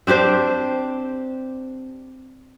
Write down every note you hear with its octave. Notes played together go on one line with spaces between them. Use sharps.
C4 D4 G4 C5